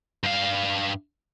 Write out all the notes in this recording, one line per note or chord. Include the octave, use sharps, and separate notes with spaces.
G2 F5